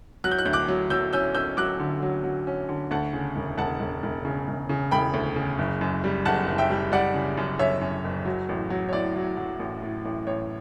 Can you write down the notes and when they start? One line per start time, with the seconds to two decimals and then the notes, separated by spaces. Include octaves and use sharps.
0.24 F#3 F#6
0.31 G6
0.39 F#6
0.45 D2 G6
0.53 D6 F#6
0.68 F#3
0.90 F#3 E6 G6
1.13 C#4 E6 G6
1.35 C#4 E6 G6
1.57 F#3 D6 F#6
1.80 D3
2.02 F#3
2.24 F#3
2.47 C#4
2.69 D3
2.91 D2 F#5 A5
3.13 C#3
3.36 E1
3.58 E1 F#5 A5
3.80 E1
4.03 E1
4.25 C#3
4.48 E1
4.69 C#3
4.91 E1 G5 B5
5.14 D2
5.36 C#3
5.58 F#1
5.81 F#2
6.04 G3
6.25 F#1 F#5 A5
6.47 F#1
6.58 E5 G5
6.70 G3
6.92 G3 D5 F#5
7.14 C#3
7.37 F#2
7.59 F#2 C#5 E5
7.81 F#2
8.04 F#1
8.25 F#3
8.49 A1
8.70 F#3
8.89 C#5
8.93 A2 D5
9.16 F#3
9.37 F#3
9.60 A1
9.82 A2
10.05 A1
10.27 A1 C#5